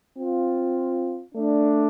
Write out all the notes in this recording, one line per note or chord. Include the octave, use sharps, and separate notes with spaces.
C4 F4
A3 D4